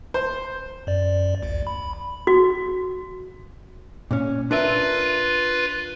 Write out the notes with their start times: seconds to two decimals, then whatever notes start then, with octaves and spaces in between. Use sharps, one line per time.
0.14 C5
0.87 F#2 D5
1.43 A1 D2
1.67 B5
2.27 F#4
4.11 A#2 C#4
4.51 D4 F4 A#4 B4 E5